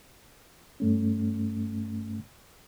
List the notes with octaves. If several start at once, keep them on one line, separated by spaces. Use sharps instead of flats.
G2 A3 C#4